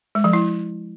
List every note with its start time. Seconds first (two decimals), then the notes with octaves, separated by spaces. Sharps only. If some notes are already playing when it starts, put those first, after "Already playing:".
0.15 G#3
0.24 F3
0.33 E4